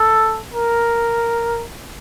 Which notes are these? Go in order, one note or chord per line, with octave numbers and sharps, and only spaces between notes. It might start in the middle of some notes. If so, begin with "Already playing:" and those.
Already playing: A4
A#4